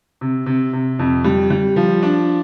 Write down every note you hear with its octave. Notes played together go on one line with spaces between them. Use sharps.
C3
C3
C3
F2
G3
G3
F3
D4